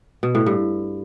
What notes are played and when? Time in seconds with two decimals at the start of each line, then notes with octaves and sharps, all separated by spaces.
0.23 B2
0.35 A2
0.46 G2